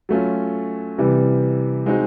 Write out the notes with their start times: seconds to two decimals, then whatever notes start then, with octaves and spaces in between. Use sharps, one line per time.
0.09 F#3 A3 C#4 F4
0.98 C3 E3 G3
1.86 G#3 C4 D#4 F#4